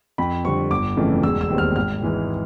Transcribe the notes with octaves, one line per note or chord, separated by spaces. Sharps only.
F2 B5
D3 G3 C4 C#6
G1 D6
F2 C#3 E3 A3
E1 E6
E6
D#2 D#3 G3 C4
F6
G#1 F6
G#2 E3 G#3